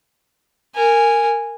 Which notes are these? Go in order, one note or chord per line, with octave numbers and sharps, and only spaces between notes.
A#4 G#5